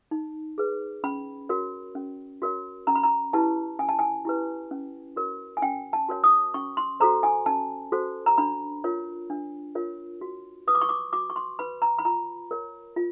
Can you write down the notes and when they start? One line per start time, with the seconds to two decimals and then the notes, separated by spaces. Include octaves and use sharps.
0.11 D#4
0.58 G#4 B4
1.04 C#4 B5
1.49 F#4 A#4 C#5
1.95 C#4
2.42 F#4 A#4 C#5
2.87 C#4 A#5
2.95 B5
3.03 A#5
3.33 E4 G4 B4 A5
3.79 C#4 G#5
3.89 A5
3.99 G#5
4.25 E4 G4 B4
4.71 C#4
5.16 F#4 A#4 C#5
5.57 G#5
5.62 C#4 G5
5.93 A5
6.09 F#4 A#4 C#5
6.24 D#6
6.54 C#4 C#6
6.77 C6
7.00 F#4 A4 C5 A#5
7.23 G#5
7.46 C#4 A5
7.92 F#4 A4 C5
8.26 A#5
8.38 D4 B5
8.84 F4 A#4 C#5
9.30 D4
9.75 F4 A#4 C#5
10.21 F#4
10.67 B4 D#6
10.75 D6
10.81 C#6
10.89 D6
11.13 F#4 D6
11.30 C#6
11.36 C6
11.59 B4 B5
11.82 A#5
11.99 B5
12.05 F4 A#5
12.51 A#4 C#5
12.96 F4